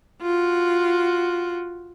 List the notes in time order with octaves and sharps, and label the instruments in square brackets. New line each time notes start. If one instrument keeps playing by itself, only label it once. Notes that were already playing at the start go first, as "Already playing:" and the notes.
[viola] F4 F#4